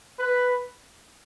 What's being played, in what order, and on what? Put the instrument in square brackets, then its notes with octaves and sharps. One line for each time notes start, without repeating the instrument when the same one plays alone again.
[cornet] B4